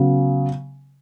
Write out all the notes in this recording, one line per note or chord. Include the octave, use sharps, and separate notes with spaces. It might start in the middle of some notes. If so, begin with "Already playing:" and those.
Already playing: C#3 F#3 B3